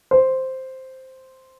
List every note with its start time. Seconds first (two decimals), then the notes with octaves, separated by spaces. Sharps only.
0.11 C5